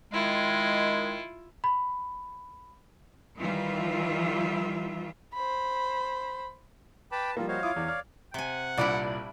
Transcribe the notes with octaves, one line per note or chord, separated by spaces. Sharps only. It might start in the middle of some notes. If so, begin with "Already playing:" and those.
D#3 G#3 E4 F4
B5
D#3 E3 G3 F4 E5
C5 B5
B4 G5 A5 B5 D6
F3 G3 A#3 F4 A4
F#4 C5 C#5 D#5 F5
E4 F4 D6 D#6
E2 D5
D5 F6
C3 F#5 G#5
C2 A#2 G3 D4 E4 D5